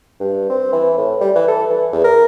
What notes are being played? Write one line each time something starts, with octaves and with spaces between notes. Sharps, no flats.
G2
C4
E3
A2
G3
E3
A4
E3
E2
A#4